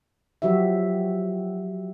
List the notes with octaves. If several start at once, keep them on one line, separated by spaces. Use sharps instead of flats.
F3 F#3 F#4 G4 E5